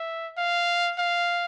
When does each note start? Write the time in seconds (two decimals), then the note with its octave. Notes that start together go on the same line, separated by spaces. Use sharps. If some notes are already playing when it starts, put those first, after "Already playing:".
Already playing: E5
0.37 F5
0.98 F5